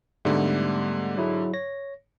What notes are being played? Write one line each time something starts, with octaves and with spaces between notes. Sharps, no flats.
G#2 D3 G3 A3 B3
F#3 E4 G#4
C#5 A#6